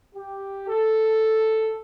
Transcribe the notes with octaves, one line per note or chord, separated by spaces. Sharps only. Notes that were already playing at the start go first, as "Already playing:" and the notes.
G4
A4